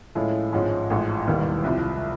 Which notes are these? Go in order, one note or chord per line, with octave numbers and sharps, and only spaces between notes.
A2 F3 G#3 C#4 F4
G#1 G#2 F3 G#3 C#4
A1 G#2 F3
E1 D#2 D#3 G3 B3
C2 C3 F3